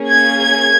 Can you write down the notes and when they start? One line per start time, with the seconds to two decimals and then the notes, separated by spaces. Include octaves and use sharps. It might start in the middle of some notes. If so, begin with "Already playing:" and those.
Already playing: A#3 C#4 G#4
0.09 G#6
0.42 G#6